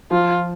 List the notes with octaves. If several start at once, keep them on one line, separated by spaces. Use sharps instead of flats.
F3 F4